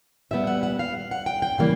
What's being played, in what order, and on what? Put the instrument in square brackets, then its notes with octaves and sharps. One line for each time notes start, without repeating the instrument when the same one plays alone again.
[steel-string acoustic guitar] A#2 G3 B3 E5
F#5
F#5
F5
F#5
G5
G5
C#3 E3 G3 A#3